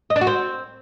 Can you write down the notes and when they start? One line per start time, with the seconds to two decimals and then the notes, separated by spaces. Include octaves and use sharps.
0.10 D#5
0.16 D4
0.21 F#4
0.27 C4